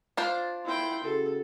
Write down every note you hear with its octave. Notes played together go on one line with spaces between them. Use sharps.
D4 F4 C5
E4 G5 C6
C#3 F#4 A4